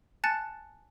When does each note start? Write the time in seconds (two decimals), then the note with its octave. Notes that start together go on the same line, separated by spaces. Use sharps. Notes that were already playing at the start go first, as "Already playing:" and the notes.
0.24 G#5 A5 F#6 A6 C#7